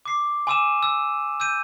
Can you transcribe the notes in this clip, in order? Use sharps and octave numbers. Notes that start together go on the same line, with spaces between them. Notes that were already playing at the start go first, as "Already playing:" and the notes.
D6 C7
G#5 C6 D6 E6 D#7 E7
E6
E6 G6 D#7